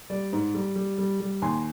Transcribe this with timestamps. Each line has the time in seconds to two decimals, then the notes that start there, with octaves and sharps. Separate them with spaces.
0.10 G3 D5
0.33 G#2
0.54 G3
0.76 G3
0.98 G3
1.20 G3
1.42 D#2 G#5 C6